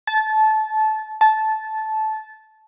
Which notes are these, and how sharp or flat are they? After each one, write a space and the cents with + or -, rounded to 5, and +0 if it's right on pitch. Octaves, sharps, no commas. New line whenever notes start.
A5 -20
A5 -15